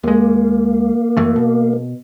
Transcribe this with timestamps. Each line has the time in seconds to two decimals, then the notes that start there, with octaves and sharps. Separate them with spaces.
0.04 D#2 G#3 A#3
1.17 F#2 E3 A3
1.36 B2